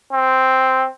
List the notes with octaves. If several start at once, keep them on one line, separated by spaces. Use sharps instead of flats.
C4